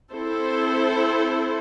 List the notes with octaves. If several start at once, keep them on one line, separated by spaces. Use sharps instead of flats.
C4 E4 A4 C5